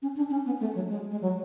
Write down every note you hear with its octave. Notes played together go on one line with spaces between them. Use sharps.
C#4
D4
C#4
B3
A3
F#3
G#3
G#3
F#3